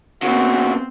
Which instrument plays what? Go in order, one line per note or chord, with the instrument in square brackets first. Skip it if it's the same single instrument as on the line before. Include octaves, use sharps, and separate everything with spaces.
[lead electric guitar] A#2 C#3 [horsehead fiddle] B3 C4 [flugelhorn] F#4